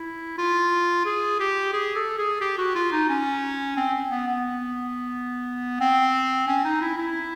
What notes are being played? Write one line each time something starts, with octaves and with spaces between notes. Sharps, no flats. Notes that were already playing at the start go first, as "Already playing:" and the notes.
Already playing: E4
F4
G#4
G4
G#4
A4
G#4
G4
F#4
F4
D#4
C#4
C4
B3
B3
C4
C#4
D#4
E4
E4